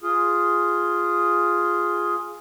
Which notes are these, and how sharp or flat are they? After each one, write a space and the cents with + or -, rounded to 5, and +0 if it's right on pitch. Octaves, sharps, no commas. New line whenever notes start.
F4 +0 G#4 +0